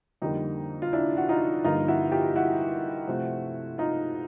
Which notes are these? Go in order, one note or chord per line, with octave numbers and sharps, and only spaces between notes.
F2 D3 G3 A#3 D#4
F4
D4 E4
F#4
D#4 F4
G2 D3 F3 A#3 D#4 F4
E4 F#4
F4 G4
E4 F#4
C3 F3 A3 C4
D#4 F4